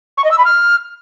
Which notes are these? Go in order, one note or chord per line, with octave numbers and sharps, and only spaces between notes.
C#6
D#5
E6
B5
F6